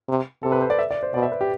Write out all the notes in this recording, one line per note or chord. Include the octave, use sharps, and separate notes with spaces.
C3
C3 A4
B4
C5
D5
E5
D5
C5
B2 D5
E5
B4
G4